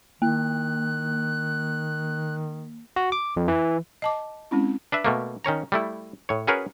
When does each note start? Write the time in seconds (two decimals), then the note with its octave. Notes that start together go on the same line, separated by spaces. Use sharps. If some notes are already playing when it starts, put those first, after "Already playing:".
0.22 D#3 A#3 F#6
2.96 F#4
3.12 D6
3.37 F2
3.48 E3
4.02 D#5 A5 D6
4.51 G#3 C4 C#4 E4
4.92 D4 B4 E5
5.05 B2 A3 A#3
5.44 D#3 C#4 C#5 A#5
5.72 G3 A3 E4
6.29 A2 C#5
6.47 C#4 F#4 G#4 A#4 B4 C#5